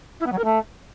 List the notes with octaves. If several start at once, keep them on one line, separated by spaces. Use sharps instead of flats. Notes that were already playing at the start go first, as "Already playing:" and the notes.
E4
B3
F#3
A#4
A3